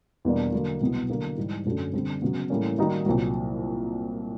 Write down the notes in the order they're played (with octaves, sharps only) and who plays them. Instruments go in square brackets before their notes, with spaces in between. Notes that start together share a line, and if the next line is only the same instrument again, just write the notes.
[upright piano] E2 B2 G3 A#3 D4
D3 F#3 A#3
C2 B2 F#3 B3 E4
D3 F#3 A#3
G#2 E3 G3
F#2 D3 F#3 A3 C#4
D3 G3 C4
C#3 F#3 B3
A2 E3 G3 A#3 C#4
D#3 G3 A#3 D#4 F#4
C2 A#2 F#3